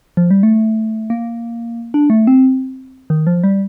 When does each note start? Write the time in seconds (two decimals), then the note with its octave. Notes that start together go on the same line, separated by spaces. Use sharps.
0.17 F3
0.31 G3
0.43 A3
1.10 A#3
1.94 D4
2.10 A3
2.27 C4
3.10 D#3
3.27 F3
3.44 G3